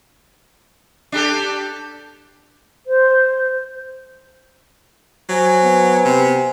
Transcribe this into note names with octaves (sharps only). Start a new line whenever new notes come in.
D4 G4 A4
C5
F#3 C5 G#5
B3
C3